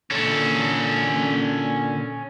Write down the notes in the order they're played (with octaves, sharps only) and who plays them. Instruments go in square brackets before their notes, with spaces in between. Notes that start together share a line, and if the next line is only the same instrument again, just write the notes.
[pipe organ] A#2 D3 [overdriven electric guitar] C#4 A4